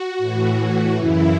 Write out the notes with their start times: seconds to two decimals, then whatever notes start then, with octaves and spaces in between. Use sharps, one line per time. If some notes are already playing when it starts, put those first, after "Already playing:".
Already playing: F#4
0.18 A2 E3
0.94 F#2 C#3 E3 E4